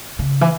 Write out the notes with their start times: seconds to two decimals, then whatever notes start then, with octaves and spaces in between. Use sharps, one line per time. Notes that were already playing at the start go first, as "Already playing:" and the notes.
0.19 C#3
0.41 E3